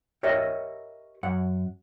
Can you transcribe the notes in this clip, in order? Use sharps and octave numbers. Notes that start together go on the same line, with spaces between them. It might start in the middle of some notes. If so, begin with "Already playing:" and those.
G4 A#4 B4 C#5 D#5 E5
F#2 F#5